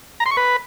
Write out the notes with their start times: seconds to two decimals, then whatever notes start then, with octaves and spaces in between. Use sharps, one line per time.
0.20 A#5
0.26 C6
0.31 C#6
0.37 B4